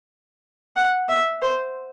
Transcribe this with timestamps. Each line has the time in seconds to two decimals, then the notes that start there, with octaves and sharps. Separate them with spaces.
0.76 F#5
1.09 E5
1.42 C5